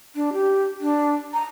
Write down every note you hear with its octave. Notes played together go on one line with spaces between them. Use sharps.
D4
G4
D4
A#5